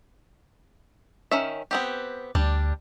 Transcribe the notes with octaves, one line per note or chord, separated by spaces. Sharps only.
D#3 C#4 E5
B3 C4 G4
D2 G3 D4